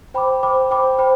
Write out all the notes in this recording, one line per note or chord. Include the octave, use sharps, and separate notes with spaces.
C5 G5 B5 D6
C5 G5 B5 D6
C5 G5 B5 D6
C5 G5 B5